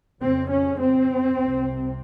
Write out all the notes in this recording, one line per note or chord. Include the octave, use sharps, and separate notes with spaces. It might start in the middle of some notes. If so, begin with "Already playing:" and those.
F2 C#3 C4
C#4
C4
C2 C3